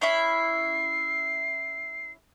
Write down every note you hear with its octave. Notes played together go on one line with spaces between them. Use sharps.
C#4 E4 E5 C7